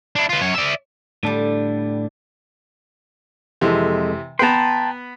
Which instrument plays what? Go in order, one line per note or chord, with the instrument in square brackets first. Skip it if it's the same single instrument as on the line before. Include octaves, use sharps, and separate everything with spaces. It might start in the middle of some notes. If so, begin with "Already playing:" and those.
[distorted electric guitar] D4 E4
F4 B4
F#2 C#5
D5 E5
[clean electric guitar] A2 D4 [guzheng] D3 G3
[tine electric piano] F2 G#3 A4 [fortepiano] C3 E3
[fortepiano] B3 B4 [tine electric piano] G5 A#5 [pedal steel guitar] A5 C6